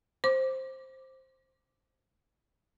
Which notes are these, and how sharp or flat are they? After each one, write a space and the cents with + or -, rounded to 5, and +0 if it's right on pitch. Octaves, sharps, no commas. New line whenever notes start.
C5 +10 D6 +0